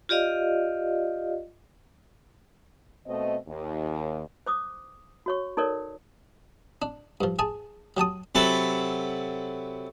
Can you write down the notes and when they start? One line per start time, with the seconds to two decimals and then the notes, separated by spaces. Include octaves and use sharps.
0.09 F4 G4 D5 D#5 F5
3.07 B2 A3 C4 D#5
3.48 D#2
4.46 C5 D6 D#6
5.26 F#4 C#5 C#6
5.57 D#4 A4 A#4 C#5 D5
6.82 D4
7.21 G2 F3
7.39 G#4 G#5 A5
7.97 F#3 G4 A5 D#6
8.35 C3 F#3 A4 B4